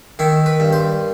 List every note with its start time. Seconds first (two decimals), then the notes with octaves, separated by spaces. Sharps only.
0.19 D#3 E4
0.46 B4
0.60 G2
0.73 C5